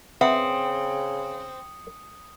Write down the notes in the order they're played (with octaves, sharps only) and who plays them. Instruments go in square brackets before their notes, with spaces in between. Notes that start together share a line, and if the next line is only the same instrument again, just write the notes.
[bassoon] C#3 [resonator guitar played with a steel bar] C4 [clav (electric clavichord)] B4 E5 F#5 [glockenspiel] D#6 C#7 F#7